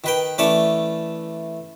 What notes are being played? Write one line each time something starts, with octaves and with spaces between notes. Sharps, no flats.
D#3 B4 G5
E3 A3 C#4 D5 A5 C#6